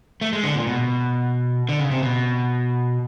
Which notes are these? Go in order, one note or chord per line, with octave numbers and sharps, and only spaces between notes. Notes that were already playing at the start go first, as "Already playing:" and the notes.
A3
G#3
D3
A#2
B2
D3
C#3
C3
B2